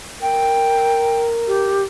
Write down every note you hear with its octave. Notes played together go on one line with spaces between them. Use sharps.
A#4 G5
G4